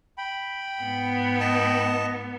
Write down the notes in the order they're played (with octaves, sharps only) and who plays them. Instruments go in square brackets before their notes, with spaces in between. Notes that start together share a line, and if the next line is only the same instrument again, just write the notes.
[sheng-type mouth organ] G5 B5
[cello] G#2 B3
[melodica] D#5 A5